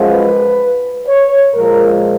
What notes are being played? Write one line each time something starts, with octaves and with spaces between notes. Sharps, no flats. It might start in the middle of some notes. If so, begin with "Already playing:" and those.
Already playing: F#2 F3 G#3
B4
C#5
A#2 F3 G#3 A#4